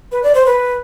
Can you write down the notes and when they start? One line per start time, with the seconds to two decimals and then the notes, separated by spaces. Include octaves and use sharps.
0.12 B4
0.23 D5
0.35 C5
0.46 B4